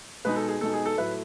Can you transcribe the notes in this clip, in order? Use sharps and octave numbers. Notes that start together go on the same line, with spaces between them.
B2 G#3 D#4 B4
A4
G#4
B2 G#3 D#4 A4
G#4
A4
A2 F#3 A3 E4 B4